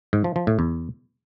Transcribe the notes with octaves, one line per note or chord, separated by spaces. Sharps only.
G#2
F3
F3
A2
E2